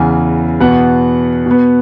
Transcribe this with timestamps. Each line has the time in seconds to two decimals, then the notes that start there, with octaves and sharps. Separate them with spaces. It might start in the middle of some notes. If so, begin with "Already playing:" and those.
Already playing: E2 C#3 E3 G#5
0.60 E2 B2 B3 F#5
1.46 B2 B3